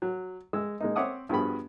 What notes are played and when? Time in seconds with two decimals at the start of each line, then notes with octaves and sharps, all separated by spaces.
0.02 F#3
0.53 G#3 E6
0.80 G#3 A#3 D#4
0.96 C4 C#5 E5 F#5 D6 D#6
1.29 G2 F3 B3 F#4 G#4 B5